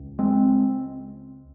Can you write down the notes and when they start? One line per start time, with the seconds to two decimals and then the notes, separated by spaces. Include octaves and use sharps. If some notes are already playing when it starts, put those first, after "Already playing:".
Already playing: C#2
0.19 G#3 C4